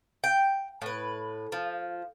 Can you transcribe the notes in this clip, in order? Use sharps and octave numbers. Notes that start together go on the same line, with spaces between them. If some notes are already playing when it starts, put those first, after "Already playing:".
G5
A2 B4
F3